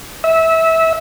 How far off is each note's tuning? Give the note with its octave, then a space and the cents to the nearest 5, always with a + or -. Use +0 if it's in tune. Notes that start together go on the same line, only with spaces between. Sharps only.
E5 -20